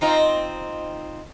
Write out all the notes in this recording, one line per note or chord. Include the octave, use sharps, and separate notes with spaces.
C4 D#4 F4